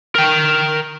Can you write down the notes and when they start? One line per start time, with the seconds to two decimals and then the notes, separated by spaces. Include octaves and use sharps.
0.16 A#4 G5